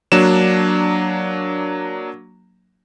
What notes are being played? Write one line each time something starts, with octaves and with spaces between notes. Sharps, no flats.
F#3 A#3 D4 E7